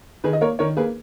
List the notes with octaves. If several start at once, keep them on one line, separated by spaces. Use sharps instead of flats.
D#3 G#4 B4
D#5
A#3 A#4 C#5
D#3 A#4 C#5
A#3 G#4 B4